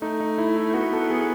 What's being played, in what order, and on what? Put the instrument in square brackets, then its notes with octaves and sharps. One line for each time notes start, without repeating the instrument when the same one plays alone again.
[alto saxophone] A3 [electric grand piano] D#4
[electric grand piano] D#4
E4
E4
[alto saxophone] B3 [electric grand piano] F#4
[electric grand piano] A4
G#4